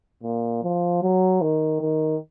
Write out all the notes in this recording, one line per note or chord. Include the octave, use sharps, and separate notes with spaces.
A#2
F3
F#3
D#3
D#3